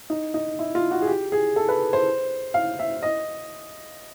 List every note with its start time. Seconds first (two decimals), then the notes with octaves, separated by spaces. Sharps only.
0.10 D#4
0.34 D#4
0.59 E4
0.75 F4
0.91 F#4
1.02 G#4
1.07 G4
1.32 G#4
1.56 A4
1.69 B4
1.93 C5
2.54 F5
2.79 E5
3.03 D#5